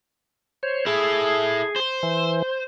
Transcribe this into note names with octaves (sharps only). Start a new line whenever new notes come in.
C5 C#5
E4 G#4 A4
C5
E3